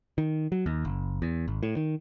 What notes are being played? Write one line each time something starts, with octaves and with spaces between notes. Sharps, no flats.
D#3
F#3
D#2
F#1
E2
G#1
A2
D#3